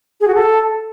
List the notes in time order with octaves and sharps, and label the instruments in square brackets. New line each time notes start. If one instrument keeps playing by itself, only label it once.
[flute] G#4
F#4
A4